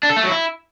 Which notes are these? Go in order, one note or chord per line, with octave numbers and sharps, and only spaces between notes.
D4
A4
A3
F#3
E4